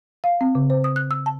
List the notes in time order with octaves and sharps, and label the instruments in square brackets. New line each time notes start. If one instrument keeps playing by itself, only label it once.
[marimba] F5
C4
C#3
C5
D#6
F#6
E6
A5